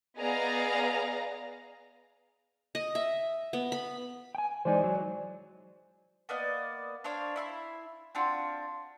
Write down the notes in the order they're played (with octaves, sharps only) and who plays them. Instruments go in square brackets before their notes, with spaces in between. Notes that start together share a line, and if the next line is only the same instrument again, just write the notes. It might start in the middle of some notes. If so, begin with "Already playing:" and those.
[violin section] B3 G#4 D5 D#5 F5 A#5
[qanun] D#5
E5
B3
B5
[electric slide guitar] G5 G#5
[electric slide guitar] E3 G#3 D#4 [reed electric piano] C5 D5 G#5
[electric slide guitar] F#3
[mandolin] A#3 B3 D5 D#5
D4 C5 C#5 F5
E4 E5 C6
C4 D4 F4 F#4